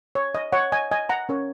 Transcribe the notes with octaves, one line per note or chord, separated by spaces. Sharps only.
C#5
D#5
C#5 F#5
D#5 G#5
D#5 G#5
F#5 A#5
C#4 A#4 C#5